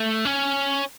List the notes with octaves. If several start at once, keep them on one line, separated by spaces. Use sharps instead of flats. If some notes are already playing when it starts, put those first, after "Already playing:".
Already playing: A3
C#4